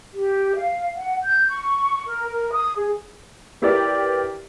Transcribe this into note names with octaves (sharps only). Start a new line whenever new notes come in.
G4
F5
F#5
G6
C#6
A#4
A#4
D#6
G#4
B3 E4 G4 A#4 D5 G5